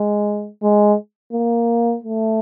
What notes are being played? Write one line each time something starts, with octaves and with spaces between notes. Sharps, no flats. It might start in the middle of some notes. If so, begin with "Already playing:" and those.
Already playing: G#3
G#3
A#3
A3